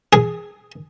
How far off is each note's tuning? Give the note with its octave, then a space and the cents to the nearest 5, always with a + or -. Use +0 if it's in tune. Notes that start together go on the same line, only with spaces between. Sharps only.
G#4 +0